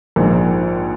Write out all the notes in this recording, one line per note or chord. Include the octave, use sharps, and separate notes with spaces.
A#1 G#2 F3